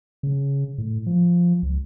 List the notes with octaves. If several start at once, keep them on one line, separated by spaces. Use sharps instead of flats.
C#3
A2
F3
C#2